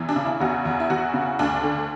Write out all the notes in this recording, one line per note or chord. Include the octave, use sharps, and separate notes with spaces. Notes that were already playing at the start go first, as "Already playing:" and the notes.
Already playing: E2 E3
D4
C#3
E4
E2 F#4
E2
E4
E3 F#4
C#3
D2 D4
D3